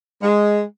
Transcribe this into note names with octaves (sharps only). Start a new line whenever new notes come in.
G#3